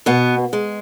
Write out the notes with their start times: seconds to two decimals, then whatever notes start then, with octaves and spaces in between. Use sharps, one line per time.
0.06 B2 B3
0.53 G#3